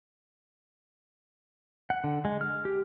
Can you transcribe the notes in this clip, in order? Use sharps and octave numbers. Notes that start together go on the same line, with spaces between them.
F#5
D3
G#3
F6
G4